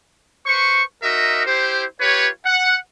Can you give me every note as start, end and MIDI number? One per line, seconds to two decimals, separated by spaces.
0.46 0.81 71
0.46 0.81 72
0.46 0.81 85
1.03 1.43 63
1.03 1.43 66
1.03 1.43 70
1.03 1.43 75
1.03 1.43 76
1.46 1.84 64
1.46 1.84 67
1.46 1.84 72
2.01 2.28 65
2.01 2.28 67
2.01 2.28 71
2.01 2.28 73
2.46 2.77 78